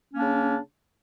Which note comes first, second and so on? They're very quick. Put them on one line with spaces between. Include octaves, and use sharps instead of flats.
C#4 A#3 D4 C#3